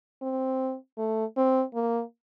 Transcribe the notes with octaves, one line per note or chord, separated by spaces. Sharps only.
C4
A3
C4
A#3